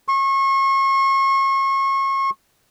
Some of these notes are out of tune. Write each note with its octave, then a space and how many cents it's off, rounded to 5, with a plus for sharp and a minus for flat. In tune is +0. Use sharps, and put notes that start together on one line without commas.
C#6 -35